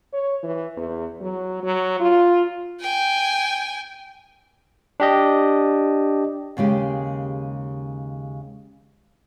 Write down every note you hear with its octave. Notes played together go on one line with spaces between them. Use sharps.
C#5
E3
E2
F#3
F#3
F4
G5 G#5
D4 G4 D#5
D#2 C#3 G#3 G4